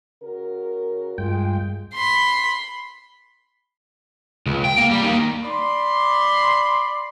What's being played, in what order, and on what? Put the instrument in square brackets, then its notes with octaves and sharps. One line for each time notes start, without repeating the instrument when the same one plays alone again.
[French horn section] C#3 F#4 A#4
[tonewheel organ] G2 G5 [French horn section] G#3 F4
[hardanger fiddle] B5 C6
[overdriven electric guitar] C#2
G5
A#3
G3
A#3 D#4
[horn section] D5 B5 C6